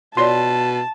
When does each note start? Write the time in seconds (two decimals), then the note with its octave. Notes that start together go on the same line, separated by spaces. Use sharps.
0.17 B2 F4 C#5 D5 A5 C6